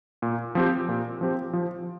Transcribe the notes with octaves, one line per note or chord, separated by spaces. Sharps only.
A#2
F3 C4 G4
A#2
F3 C4 G4
F3